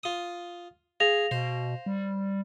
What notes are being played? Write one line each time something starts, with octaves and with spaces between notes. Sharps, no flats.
F4 D#6
G#4 F5 A#6 F7
B2 C5
G3